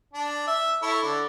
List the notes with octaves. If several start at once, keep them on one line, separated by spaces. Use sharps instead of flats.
D4
E5
E4 A4 C#5
D3 D5